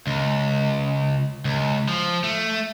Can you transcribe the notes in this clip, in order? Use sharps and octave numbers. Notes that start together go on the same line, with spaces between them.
C#2
C#2
F3
A3